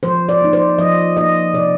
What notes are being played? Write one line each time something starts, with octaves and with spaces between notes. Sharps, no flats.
F3 C5
D5
A#3 D#4
C5
F3 D#5
A#3 D#4 D#5
C3 D5